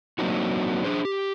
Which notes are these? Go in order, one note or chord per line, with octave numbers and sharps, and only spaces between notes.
F#3 A#3 C4 D4 D#4 F#4
D4 G#4 C5
G4